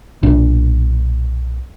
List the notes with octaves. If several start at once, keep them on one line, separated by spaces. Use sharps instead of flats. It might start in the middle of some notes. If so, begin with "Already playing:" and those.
B1 A#2 D4